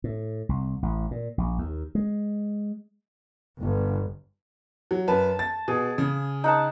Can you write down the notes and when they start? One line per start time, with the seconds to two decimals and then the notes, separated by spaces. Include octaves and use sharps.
0.04 A2
0.49 C2
0.83 A1
1.11 A#2
1.38 A#1
1.58 D#2
1.95 G#3
3.60 G1
4.91 F#3
5.08 F#2 B4 A5
5.39 A6
5.68 B2 G#4
5.98 C#3
6.44 D#4 F#5 A5